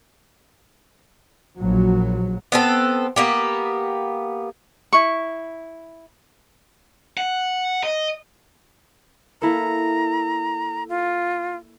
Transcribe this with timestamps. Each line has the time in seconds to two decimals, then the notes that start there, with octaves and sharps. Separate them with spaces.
1.58 A#1 F#3
2.52 B3 C4 A4
3.16 A#3 B3 G4
4.93 E4 C#6
7.17 F#5
7.84 D#5
9.42 A#3 E4 A4 A#5
10.89 F4